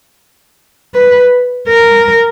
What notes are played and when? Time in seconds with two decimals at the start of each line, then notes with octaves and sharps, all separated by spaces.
0.94 B4
1.68 A#4